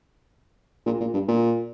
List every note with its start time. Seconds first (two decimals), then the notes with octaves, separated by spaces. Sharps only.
0.86 A#2
1.00 A#2
1.14 G2
1.28 A#2